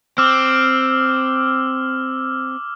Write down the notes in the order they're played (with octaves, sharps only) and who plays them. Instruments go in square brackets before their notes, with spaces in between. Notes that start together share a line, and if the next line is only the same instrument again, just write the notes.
[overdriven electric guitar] C4 [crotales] D6 E6 F6